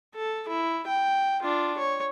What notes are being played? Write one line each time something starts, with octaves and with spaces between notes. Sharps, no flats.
A4
E4
G5
D4 F4
C#5